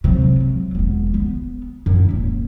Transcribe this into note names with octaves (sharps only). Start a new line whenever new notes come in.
C3 F#3
F#3
E1 B3
B3
F#2 E4
D#1